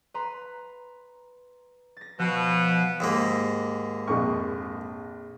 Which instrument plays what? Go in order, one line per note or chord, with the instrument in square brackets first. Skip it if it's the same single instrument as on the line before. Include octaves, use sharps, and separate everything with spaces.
[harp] B4 A#5 C6
A6 A#6
[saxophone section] B2 [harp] F3
[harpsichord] D#2 G#2 A#3
[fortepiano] A#1 F2 C#6